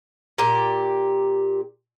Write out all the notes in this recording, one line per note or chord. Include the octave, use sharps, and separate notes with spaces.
A#2 G4